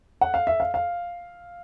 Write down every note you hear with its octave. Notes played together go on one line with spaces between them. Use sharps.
F#5
F5
E5
F5
F5